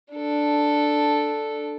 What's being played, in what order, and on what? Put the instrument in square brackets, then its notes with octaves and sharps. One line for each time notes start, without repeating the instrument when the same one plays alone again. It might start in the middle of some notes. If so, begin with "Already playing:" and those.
[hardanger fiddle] D4 A4